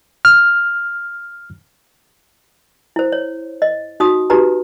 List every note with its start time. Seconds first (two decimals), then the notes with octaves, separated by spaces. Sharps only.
0.25 F6
2.96 E4 C5
3.12 C#5
3.62 D#5
4.00 D#4 F#4 D#6
4.30 D#4 F#4 G4 B4 A#5